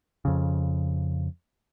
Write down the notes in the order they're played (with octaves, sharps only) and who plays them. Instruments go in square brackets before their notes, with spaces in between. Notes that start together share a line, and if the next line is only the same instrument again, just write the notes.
[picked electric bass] F2 C#3